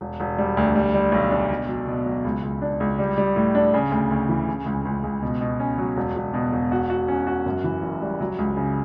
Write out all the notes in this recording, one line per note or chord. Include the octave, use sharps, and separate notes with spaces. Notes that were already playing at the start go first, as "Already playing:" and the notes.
E1
E1
G3
D2
G3
G3
B1
D4
B2
F#3
B2
F#3
C#2
C#2
D4
C#2
G3
G3
A2
D4
C#3
D2
D2
E3
C#3
C#2
C#2
C#2
B2
B2
C#4
F#3
E1
E1
B2
E1
F#4
F#4
C#4
F#4
F#2
E3
F#1
G3
F#3
C#2
C#3